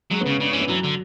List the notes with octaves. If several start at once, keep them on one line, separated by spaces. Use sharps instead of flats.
F#3 G#3
B3
C#3 C#4
C#3 D4
C#4
E3
B3
E3 F#3
D3